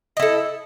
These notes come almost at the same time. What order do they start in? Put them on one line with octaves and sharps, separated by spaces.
D#5 E4 A4